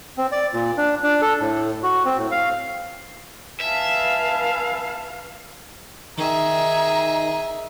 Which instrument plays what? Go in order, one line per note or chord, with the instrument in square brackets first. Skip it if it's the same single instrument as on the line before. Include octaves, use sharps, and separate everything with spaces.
[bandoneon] C4
D5
A#2
D4
D4
A4
A2
F#4
C4
A2
F5
[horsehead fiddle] B4 F5 [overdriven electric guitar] E5 [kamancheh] G#5 A5
[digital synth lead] D#3 [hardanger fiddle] G#4 E5 [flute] A#5